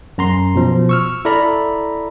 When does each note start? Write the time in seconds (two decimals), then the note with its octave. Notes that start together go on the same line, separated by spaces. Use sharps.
0.18 F#2 A#5 C6
0.55 B2 F3
0.89 C#6 E6 F6
1.25 E4 A4 D5 A#5 B5